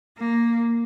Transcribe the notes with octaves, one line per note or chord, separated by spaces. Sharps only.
A#3